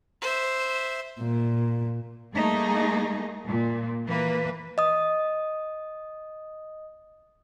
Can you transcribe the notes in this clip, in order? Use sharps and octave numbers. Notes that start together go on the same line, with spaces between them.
C5 E5
A#2
G3 A3 A#3 D#4 G#4
A#2
E3 A#3 B4
D#5 D#6